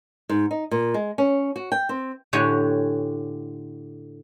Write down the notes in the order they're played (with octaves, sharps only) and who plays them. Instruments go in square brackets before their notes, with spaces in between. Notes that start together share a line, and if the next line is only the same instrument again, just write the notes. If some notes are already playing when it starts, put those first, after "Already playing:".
[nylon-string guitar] G#2
D#4
A#2
G#3
C#4
F#4
G5
C4
[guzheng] A2 D3 G4 C#5 F#5 G#5